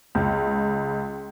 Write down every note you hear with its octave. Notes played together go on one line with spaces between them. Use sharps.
C#2